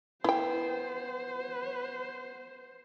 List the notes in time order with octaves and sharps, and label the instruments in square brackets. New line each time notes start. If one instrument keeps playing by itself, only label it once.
[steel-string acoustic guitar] B3 [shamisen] E4 G5 [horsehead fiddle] C5